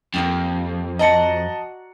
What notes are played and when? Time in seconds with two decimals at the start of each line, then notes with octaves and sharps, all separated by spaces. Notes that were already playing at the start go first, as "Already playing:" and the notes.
0.14 F2 A#3 D4 G4
0.99 F#4 D5 D#5 A5 A#5 C#7